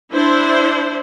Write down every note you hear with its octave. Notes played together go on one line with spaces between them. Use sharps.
D4 E4 C5